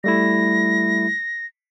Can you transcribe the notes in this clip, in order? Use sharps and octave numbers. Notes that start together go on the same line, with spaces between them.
G3 A3 E4 A#6